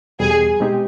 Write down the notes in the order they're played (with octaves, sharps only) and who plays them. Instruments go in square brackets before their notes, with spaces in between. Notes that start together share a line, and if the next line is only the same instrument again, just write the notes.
[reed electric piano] E2 B2 G3 [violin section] G#4
[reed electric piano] B2 G#3 C4 D#4 G4